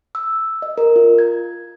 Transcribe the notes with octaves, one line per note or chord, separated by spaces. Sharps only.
E6
D#5
A#4
F4
G#6